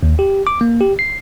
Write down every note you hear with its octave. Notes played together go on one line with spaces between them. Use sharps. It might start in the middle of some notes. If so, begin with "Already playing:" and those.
D#2
G4
D6
A#3
G4
C7